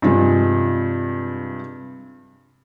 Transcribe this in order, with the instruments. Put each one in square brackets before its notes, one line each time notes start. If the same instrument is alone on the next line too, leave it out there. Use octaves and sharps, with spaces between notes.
[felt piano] G2 C3 F3 G#3